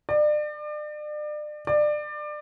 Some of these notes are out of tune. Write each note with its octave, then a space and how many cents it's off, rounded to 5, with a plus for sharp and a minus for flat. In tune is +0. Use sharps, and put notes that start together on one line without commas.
D5 +35
D5 +25